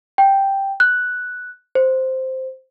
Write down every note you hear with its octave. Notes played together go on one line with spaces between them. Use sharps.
G5
F#6
C5